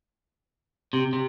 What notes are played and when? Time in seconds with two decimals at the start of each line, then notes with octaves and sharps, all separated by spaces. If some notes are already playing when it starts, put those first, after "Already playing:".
0.93 C3
1.13 C3